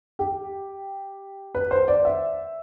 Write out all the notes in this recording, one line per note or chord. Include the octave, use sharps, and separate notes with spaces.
G4
B4
C5
D5
E5